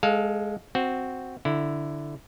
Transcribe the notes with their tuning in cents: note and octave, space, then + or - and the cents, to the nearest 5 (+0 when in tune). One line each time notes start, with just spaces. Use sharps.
G#3 +0 A4 -25 F5 +0
C4 +0 F#4 +0
D3 +0 E4 +0